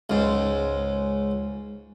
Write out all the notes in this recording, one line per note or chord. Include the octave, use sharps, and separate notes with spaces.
C#2 G#2